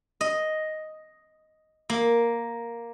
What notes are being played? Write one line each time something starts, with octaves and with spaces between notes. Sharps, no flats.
D#5
A#3